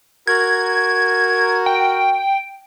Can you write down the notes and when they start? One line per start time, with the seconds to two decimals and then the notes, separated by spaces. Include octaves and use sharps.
0.27 F#4 A#4 G#6
1.66 G5